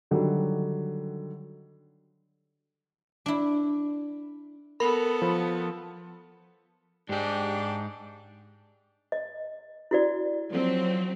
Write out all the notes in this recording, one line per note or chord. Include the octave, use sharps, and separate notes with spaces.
D3 D#3 F#3 G3
D4 E4
B3 A4 A#4 B5
F3
G#2 D4 G4 G#4
D#5
E4 F#4 D5
F3 F#3 C4